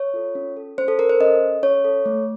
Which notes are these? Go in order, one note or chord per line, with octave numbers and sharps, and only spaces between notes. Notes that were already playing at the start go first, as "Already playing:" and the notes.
Already playing: C#5
F4 A4
C#4
A4
C#4 C5
A4
A4 A#4
C5
C#4 D#5
A4
C#4 C#5
A4
A3